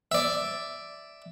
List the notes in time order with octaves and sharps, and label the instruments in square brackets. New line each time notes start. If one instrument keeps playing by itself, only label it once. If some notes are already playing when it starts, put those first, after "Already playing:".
[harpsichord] D5 E5